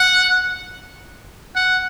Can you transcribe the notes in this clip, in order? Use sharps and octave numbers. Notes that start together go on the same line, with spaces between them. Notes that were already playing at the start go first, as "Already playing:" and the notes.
Already playing: F#5
F#5